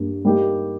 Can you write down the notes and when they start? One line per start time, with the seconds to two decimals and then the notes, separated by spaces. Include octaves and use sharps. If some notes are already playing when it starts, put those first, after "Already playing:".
Already playing: G2 G3 A#3 D4
0.25 G3 A#3 D#4 G4